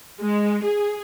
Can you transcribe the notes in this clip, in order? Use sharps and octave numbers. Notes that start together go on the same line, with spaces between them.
G#3
G#4